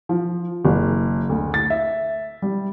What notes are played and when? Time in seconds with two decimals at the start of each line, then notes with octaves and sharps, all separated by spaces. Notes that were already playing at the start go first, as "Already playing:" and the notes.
0.09 F3
0.65 F#1
1.29 D2
1.54 A6
1.70 E5
2.42 G3